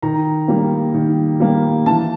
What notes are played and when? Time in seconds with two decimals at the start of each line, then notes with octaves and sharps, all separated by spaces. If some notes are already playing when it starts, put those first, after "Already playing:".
0.02 D#3 A#5
0.48 G3 A#3
0.94 D#3
1.40 G3 A#3
1.86 E3 A5